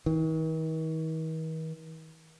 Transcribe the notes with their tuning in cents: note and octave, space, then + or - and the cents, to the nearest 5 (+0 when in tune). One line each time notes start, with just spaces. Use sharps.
D#3 +45